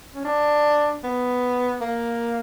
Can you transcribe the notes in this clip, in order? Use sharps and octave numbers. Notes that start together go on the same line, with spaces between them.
C#4
D4
B3
A#3